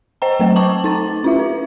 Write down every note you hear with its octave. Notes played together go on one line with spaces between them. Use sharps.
C5 D#5 G5 A#5
F#3 A3 B4 C5 G5
A5 A#5 C#6 D6 F#7
D#4 A6
C#4 E4 F4 E5
B4